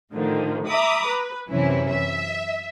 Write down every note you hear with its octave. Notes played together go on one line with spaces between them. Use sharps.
A2 D3 D#3 F3
E5 A#5 B5 D6 D#6
B4
F#2 C3 E3 C#4 E4
E5